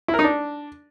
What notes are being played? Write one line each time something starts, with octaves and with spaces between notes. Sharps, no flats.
E4
A#4
D#4
D4